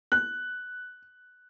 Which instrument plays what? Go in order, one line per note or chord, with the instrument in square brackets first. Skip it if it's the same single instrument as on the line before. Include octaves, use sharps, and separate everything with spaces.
[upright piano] F#6